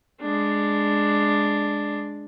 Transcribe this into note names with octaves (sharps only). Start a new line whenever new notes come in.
G#3 D4